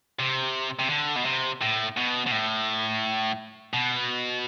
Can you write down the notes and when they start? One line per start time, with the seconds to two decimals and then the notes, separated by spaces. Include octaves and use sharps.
0.19 C3
0.79 C3
0.90 D3
1.16 B2
1.25 C3
1.62 A2
1.97 B2
2.27 B2
2.32 A2
3.74 B2